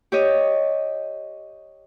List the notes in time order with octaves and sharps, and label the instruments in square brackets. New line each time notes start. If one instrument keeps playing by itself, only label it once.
[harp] G4 C#5 D#5